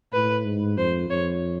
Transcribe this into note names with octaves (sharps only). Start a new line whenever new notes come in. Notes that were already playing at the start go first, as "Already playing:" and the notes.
A2 B4
G#2
F2 C5
F2 C#5